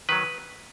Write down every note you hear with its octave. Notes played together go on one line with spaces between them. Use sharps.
D#3 F#3 B4